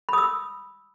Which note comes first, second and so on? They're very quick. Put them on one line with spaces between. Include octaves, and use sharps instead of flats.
B5 D#6 E6